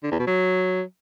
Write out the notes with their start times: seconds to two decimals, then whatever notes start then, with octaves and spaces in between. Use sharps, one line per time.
0.04 D3
0.11 E2
0.19 B2
0.27 F#3